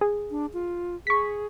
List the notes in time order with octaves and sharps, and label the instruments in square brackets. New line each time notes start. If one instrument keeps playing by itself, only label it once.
[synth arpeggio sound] G#4
[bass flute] D4
F4
[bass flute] G#4 [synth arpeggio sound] C#6 B6